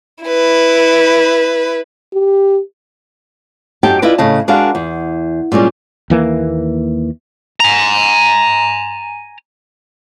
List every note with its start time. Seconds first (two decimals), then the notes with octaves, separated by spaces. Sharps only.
0.24 E4 B4
2.14 G4
3.83 F#2 D#4 G4 G5 A5
4.02 E4 F4 B4 D5 D#5
4.18 A2 C#3 D#5 A5
4.48 G#3 D4 F#4 A#4 D5 F5
4.75 E2
5.52 A#2 G3 G#3 C#4
6.10 D#2 E3 A#3
7.60 G#5 A#5